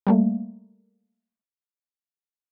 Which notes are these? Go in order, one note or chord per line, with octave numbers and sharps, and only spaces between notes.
G3 A3 A#3